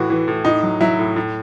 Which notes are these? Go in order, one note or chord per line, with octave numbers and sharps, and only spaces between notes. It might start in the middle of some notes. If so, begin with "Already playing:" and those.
Already playing: A2 E3 F#4
E3
A2
A2 D#4
F#3
F#3 E4
A2
A2